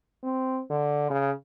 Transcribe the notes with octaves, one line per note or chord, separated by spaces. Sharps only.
C4
D3
C#3